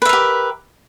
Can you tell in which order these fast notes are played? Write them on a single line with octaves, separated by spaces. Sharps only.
B4 E5 A#4 G4